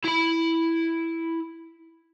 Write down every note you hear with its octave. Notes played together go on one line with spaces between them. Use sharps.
E4 B5